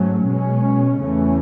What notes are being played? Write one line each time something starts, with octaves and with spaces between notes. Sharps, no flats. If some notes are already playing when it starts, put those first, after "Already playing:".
Already playing: G#2 F#3 A3 C#4
B2 G#3 C#4
E2 C#3 E3 A3 C#4